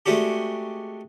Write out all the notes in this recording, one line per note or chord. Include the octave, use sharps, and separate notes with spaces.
G#3 A3 C4 D4 F#4 G4